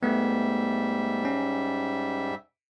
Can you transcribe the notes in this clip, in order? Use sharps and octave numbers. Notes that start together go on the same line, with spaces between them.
G#2 G3 A3 B3 E5
C#4